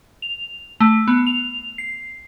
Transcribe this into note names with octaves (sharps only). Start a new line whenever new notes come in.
F7
A3
B3
F7
C7